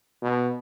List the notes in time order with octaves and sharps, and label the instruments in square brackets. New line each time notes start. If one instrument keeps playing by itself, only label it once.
[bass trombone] B2